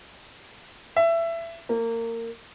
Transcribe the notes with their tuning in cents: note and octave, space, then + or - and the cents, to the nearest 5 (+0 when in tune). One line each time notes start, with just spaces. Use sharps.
E5 +20
A#3 -25